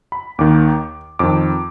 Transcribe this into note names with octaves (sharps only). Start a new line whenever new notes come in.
B5
D#2 D#3 D6
F2 D#3 D6